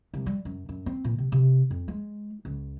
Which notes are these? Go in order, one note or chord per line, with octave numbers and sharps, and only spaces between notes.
C2
G3
F#2
F#2
C4
A#2
C3
C3
F2
G#3
C#2